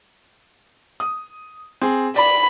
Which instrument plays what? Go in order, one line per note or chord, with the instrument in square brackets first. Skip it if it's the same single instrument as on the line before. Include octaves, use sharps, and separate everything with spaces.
[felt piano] D#6
C4 G#4
[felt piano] D5 [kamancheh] B5